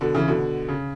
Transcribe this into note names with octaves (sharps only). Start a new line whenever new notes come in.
B2 D3
C#3 E3
B2 D3
C#3